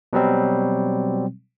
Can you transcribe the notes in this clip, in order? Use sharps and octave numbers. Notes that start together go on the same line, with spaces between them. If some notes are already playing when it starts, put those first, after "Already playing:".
B2 F#3 G3 C4